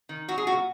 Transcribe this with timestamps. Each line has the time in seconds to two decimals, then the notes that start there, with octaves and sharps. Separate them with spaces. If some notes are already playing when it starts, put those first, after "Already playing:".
0.09 D#3
0.28 F#3 F#4
0.38 G#4
0.47 A#2 F#4